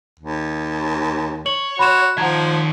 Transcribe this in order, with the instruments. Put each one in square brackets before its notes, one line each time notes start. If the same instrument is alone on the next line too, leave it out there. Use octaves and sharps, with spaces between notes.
[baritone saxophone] D#2
[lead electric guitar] C#5 [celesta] F#7
[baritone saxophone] F#4 [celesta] B5 C6 E7
[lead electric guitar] D#3 A5 [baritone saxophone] F3 [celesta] F#5 A#5 G#6